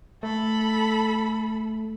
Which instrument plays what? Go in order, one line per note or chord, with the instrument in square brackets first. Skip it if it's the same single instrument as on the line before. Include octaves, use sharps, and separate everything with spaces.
[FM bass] A3 [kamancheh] A4 B5